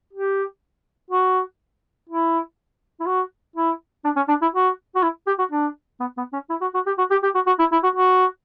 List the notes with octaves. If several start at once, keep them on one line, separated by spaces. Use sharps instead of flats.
G4
F#4
E4
E4
F#4
E4
D4
C#4
D4
E4
F#4
F#4
E4
G4
F#4
D4
B3
B3
C#4
E4
F#4
F#4
G4
F#4
G4
G4
F#4
F#4
E4
E4
F#4
F#4